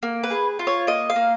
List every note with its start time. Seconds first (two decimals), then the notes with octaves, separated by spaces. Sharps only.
0.03 A#3
0.23 B4
0.30 G#4
0.59 F4
0.67 C#5
0.87 A#3 D#5
1.10 F5
1.16 A#3